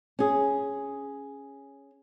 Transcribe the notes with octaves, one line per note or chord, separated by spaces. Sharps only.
C#4 G#4